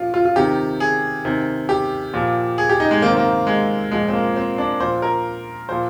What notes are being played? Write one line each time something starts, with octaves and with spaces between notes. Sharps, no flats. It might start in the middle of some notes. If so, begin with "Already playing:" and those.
Already playing: A#2 F3 F4
F4
F4
C3 D#3 G4
G#4
C3 D#3
G4
A#2 F3
G#4
G4
D#4
G#3
C3 D#3 A#3
C4
A#3
G#3
A#2 F3 G#3
C4
A#3
C4
D4
A#2 F3 C5
A#4
A#2 F3 C5